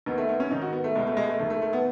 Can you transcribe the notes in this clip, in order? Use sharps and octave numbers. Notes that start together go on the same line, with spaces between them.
D#2 D#3 B3
A3
B3
C#4
G#2 D#3 D#4
F#4
B3
A3
C#2 B2 G#3
A3
G#3
A3
D#2 D#3 A3
A3
A3
B3